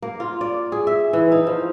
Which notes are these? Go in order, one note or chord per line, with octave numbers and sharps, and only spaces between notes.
A#3
F4
D5
G#4
E5
E3
D#4
F3